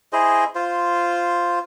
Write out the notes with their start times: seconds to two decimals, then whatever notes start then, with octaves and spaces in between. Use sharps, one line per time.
0.13 E4 G#4 C5 D#5
0.55 F4 C5